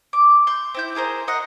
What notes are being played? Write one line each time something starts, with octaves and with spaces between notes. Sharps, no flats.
D6
C6 G6
C4 E4 G6
E4 G#4 A#4 C5
A#4 D#5 F#5